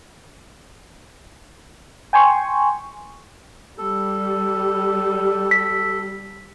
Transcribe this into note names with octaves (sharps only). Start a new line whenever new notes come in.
G5 G#5 C6 C#6
G3 A4
B6